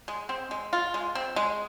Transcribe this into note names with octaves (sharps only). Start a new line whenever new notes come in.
G#3
C4
G#3
F4
G#3
C4
G#3